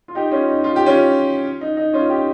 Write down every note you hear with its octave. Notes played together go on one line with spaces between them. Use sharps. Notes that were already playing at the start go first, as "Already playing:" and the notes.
F4
D#4 G4
C#4 F4
D#4
F4
G4
C#4 F4
D#4
D#4
C#4 F4
D#4 G4